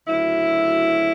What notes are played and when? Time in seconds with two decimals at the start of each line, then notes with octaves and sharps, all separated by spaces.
0.07 D2 C#3 F#3 E4